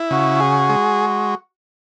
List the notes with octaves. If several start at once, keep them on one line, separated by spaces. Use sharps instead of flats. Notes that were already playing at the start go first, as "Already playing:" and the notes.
Already playing: E4
C#3 F#4
G#4
G#3